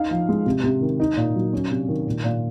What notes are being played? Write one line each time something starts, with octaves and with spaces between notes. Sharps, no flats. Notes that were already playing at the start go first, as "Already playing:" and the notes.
Already playing: D#4 F5
F3
G#3
C3
C3
D#3
D#4
A#2
F#3
C#4
C3
D#3
A#2
A#2